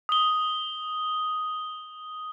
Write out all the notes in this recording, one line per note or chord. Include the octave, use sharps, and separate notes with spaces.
D#6 G7